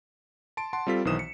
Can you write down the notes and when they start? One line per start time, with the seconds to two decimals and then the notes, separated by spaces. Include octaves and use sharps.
0.57 A5 C6 D7
0.73 F#5 A5 C6
0.87 G3 C4 F4 A4 B6
1.05 B1 D#3 E3 C5 D#6 E7
1.19 C#7